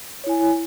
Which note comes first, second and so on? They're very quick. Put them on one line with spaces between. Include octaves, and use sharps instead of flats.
C#5 E4 G#5